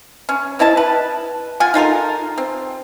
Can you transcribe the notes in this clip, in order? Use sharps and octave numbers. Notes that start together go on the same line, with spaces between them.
C#4
C4 E4 D#5 A5
B4
F4 F#5 G#5
D#4 F4 A4 A#4
C4